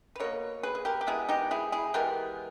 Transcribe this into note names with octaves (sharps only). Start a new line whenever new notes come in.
B4
B2 A#3 A#4 C#5
G#4 B4
G#4
G4 A#4
G4
B2 G#3 B3 E4 G#4
D#4 G4
E4 G#4
E4 G#4
E3 G#3 B3 G4 A#4